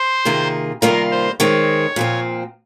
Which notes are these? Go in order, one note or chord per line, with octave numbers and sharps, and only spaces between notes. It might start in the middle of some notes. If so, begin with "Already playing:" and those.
Already playing: C5
C3 D#3 A#3 F4 G#4
C3 D#3 G3 A#3 F4 A#4
C5
D#3 G#3 C4 C#5
A#2 F3 C4